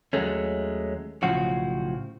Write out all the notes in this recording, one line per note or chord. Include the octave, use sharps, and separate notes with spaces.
D#2 F#3 G#3 A3 C#4
B1 A2 C#3 F3 F#4